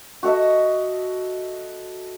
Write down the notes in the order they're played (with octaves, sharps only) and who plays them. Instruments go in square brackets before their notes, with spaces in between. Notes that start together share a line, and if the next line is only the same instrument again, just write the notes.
[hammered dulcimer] F#4 A4 D#5 E5